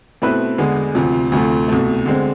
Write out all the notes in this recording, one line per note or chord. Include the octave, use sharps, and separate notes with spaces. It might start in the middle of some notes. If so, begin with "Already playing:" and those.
B2 A3 C4 E4 B4
E2 D3 G#3 B3
D2 C3 F3
D2 C3 F3 A3
C2 B2 A3
D3 G#3 C4